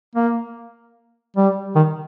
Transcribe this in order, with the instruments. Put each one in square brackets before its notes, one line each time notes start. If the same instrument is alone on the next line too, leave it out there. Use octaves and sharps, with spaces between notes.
[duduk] A#3
G3
D#3